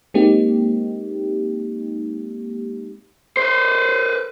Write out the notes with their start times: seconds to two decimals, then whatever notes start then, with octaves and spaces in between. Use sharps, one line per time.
0.14 G#3 A#3 C4 D#4 G4
3.37 B4 C5